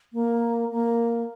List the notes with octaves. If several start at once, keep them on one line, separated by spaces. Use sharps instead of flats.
A#3
A#3